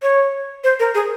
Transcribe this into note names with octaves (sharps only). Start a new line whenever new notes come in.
C#5
C5
A#4
G#4